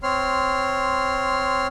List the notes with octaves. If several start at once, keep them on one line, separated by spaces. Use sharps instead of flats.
C4 C#5 C6 F6